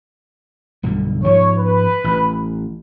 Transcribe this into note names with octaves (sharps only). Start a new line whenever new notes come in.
B1 G2 D3
G#2 F3 G#3 C#5
B4
A1